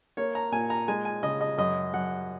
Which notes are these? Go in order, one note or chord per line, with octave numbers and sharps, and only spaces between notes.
A#3 C#5
A#5
A#2 G#5
A#5
G#3 G#5
G#5
C#3 D#5
D#5
F#2 D#5
F#2 F#5